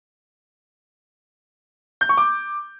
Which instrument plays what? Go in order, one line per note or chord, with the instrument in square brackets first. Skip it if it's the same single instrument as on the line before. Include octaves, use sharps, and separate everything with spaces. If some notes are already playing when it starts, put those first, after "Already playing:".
[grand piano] G6
C#6
D6